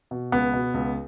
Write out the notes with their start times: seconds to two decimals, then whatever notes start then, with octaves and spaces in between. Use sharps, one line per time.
0.11 B2
0.32 C#2 B3
0.53 B2
0.74 C#2